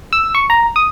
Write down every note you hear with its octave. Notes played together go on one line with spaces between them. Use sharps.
E6
C#6
A#5
D#6